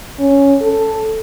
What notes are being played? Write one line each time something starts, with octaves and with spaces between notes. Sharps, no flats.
C#4
A4